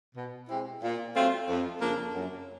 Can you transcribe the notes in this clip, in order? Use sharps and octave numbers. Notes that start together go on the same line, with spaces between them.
B2
G#3 C4 E4 G4
A#2
F#3 A3 C4 F4
F2
C#3 F3 A#3 D4
F#2